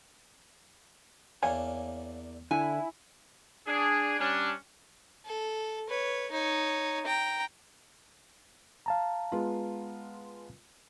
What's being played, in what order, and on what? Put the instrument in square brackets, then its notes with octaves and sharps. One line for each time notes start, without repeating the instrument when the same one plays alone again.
[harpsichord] E2 A#3 D4 [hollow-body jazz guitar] C#5 F5 G#5
[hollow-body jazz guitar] D3 [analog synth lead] E4 [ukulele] G#5
[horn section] D4 G#4
G3 C#4 D4
[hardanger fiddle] A4
B4 C#5
D#4 C#5
G5 A#5
[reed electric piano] F5 A5 A#5
[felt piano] G#3 B3 F4